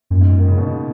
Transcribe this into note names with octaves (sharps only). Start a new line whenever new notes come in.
F#2 A#2
G#2
A#2
D#3
C#3
B2
C#3